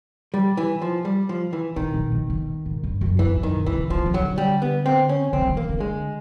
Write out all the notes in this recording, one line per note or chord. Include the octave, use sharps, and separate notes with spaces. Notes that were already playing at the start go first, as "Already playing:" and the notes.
G3
E3
F3
G3
F3
E3
B2 D#3
B2
B2
B2
G#2
G2
F#2
F2 E3
F#2
D#3
B2
C3 E3
C#3
D#3 F3
D3
C#3
D3 F#3
G3
B3
C4
C#4
D#3 C4
D3
D#3
A#3
D3
G#3